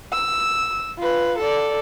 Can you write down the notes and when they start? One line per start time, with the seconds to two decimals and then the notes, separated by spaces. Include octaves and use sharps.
0.12 E6
0.98 F4 B4
1.38 A4 D5